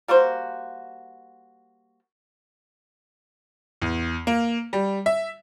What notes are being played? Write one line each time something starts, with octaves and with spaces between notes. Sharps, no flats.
G3 A#3 F#4 C5
E2
A#3
G3
E5